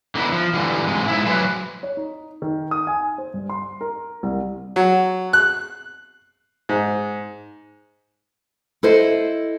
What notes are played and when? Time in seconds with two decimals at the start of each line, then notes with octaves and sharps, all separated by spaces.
0.15 D3 B3 D#4 E4
0.33 F3
0.54 D3 E3 G3
0.87 G#2 C3 G#3
1.08 G#2 E4
1.26 D3 F#3 F#4 G#4 B4 C5
1.83 C#5
1.97 D#4
2.42 D#3
2.71 D#6
2.87 G#5
3.18 C5
3.34 G2
3.49 C6
3.81 A#4
4.23 C2
4.76 F#3
5.33 F#6
6.69 G#2
8.83 E4 A4 C5 D#5